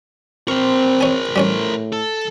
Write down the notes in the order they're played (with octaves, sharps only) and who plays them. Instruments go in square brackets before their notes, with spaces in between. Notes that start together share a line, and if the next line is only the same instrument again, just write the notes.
[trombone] C4 [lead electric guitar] A#4 C5 [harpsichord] C#6
[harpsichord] C#5 G#5
[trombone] A2 [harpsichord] G3 C#4 C#5
[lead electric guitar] A4